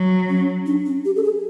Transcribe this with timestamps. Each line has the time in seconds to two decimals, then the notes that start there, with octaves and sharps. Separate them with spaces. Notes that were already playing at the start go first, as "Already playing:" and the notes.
Already playing: F#3
0.29 C#4
0.66 D4
0.86 C#4
1.05 G4
1.16 A4
1.24 G#4